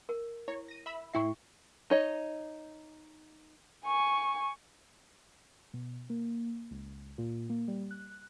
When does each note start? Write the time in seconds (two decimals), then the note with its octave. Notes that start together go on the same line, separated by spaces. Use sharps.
0.09 A#4
0.48 E4 C#5
0.68 A#6 D#7
0.86 E5 B5 E6
1.13 A2 E4 E5 G5 C#6 C7
1.90 D#4 C#5 D#5
3.85 G#5 C#6
5.74 B2
6.10 A#3
6.71 C#2
7.18 A#2
7.50 A#3
7.68 G3
7.91 F#6